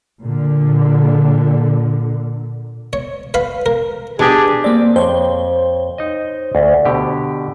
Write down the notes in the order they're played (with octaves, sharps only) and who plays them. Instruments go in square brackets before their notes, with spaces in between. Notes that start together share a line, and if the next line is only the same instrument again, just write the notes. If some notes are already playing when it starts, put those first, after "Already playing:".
[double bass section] A#2 D3
[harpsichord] C#5
B4 F5 B5
A#4
[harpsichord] B2 [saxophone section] D4 G4 G#4
[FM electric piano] A#3 D5 [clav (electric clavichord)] C4
[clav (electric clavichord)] F2 [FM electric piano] C5 C#5
[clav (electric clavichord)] D#4 D#5
D2
B2 D3 G4